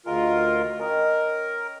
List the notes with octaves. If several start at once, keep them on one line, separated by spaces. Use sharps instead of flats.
D2 G#3 F4 A#4 F#5
C#4 A#4 D#5 G5